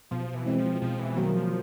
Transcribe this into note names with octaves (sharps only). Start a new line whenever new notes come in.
B2 F3
E3
G#3 C4
F3
B2 F3
E3
D#3 F#3 A#3
F3